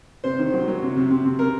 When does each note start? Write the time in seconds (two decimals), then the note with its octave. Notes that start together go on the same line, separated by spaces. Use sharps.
0.24 C3 C5
0.39 D#3
0.54 F#3
0.68 F#3
0.82 C3
0.96 C3
1.10 C3
1.25 C3
1.39 A#4